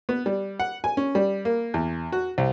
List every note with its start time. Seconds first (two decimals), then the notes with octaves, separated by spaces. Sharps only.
0.09 B3
0.26 G3
0.60 F#5
0.84 G#5
0.97 C#4
1.15 G3
1.45 A#3
1.74 E2
2.12 F#4
2.38 C2